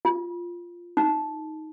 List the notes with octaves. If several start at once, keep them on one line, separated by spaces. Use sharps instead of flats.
F4
D#4